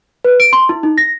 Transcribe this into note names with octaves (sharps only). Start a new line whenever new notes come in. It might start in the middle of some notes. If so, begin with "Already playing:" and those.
B4
D7
C6
E4
D#4
A#6